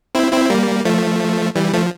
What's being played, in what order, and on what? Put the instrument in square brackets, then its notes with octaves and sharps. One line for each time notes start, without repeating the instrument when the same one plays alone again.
[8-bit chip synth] C4 E4
C4 E4
G3 A#3
F3 A3
E3 G3
F3 A3